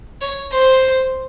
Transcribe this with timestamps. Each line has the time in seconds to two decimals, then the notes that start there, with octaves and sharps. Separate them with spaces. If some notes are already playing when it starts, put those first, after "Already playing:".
0.21 C#5
0.52 C5